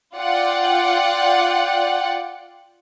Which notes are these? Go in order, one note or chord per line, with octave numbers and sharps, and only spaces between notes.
F4 D5 F#5 G5